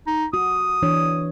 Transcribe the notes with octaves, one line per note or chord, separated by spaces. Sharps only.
D#4
F#4 D#6
E3 D4 C#5